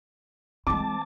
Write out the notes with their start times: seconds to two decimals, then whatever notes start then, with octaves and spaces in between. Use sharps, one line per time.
0.67 E3 G#3 C4 A5 D6